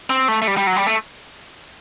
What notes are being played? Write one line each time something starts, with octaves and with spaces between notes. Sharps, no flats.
C4
A3
A3
G3
G3
F#3
G3
A3